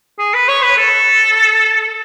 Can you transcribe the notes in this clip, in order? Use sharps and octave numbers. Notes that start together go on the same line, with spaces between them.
G#4
B4
C#5
B4
A4